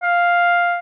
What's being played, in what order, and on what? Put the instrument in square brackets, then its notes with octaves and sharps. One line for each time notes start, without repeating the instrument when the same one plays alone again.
[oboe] F5